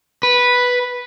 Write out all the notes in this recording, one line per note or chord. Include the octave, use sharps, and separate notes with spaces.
B4